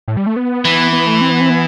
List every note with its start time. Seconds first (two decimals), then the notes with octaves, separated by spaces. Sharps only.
0.08 A2
0.17 G3
0.27 A3
0.36 B3
0.65 E3
0.93 B3
1.07 A3
1.21 C4
1.31 B3
1.41 C4
1.50 B3